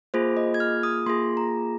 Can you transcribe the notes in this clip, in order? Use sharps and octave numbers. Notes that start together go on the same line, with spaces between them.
A#3 F4 G#4 C5
D#5
G#6
F6
D#6
A#3 F4 G#4 C6
A#5